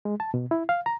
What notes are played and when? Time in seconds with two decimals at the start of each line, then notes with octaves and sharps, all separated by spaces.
0.05 G#3
0.20 A5
0.34 B2
0.51 E4
0.69 F5
0.86 A#5